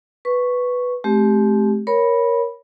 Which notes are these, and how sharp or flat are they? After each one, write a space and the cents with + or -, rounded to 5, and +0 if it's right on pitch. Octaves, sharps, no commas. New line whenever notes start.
B4 +0 C#6 +0
A3 -40 C4 +0 G4 +0
A#4 +10 C#5 +0 B5 -10